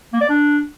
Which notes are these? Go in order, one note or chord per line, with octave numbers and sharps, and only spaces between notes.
A#3
D5
D4